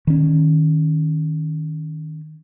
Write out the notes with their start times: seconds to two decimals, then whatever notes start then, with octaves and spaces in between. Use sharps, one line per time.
0.07 D#3 C#4